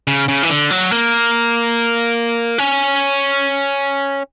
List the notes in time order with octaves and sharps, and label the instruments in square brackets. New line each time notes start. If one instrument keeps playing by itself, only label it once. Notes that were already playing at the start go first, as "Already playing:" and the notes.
[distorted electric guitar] C#3
C#3
E3
D3
F#3
A#3
C#4